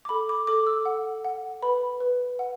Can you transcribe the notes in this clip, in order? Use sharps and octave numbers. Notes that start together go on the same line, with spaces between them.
D6
A4 B5
D6
A4 D6
E6
F#5
F#5
B4 B5
B4
F#5